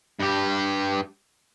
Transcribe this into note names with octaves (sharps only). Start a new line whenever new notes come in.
G2 G4